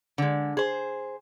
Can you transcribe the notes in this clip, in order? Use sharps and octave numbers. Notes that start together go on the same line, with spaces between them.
D3 G#3
G#4 C5